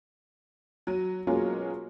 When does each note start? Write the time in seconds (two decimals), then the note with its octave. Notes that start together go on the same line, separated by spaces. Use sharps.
0.87 F#3 D#7
1.27 B2 F#3 G#3 A#3 C#4 F4